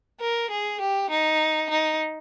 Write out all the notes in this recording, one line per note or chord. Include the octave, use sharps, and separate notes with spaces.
A#4
G#4
G4
D#4
D#4